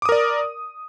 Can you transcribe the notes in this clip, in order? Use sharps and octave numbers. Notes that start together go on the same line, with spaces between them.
A#4 D5 D6 D#6